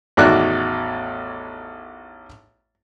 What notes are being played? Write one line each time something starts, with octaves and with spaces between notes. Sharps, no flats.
A1 E2 D#3 F#4 D5 F#6